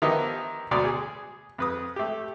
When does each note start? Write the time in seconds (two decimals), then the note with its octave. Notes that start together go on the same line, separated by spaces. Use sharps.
0.02 D#3 F3 B3 E4 G4 D#5
0.71 D2 B2 D5 A#5 D#6
0.85 G#4
1.58 F2 B4 D#6
1.96 A3 G4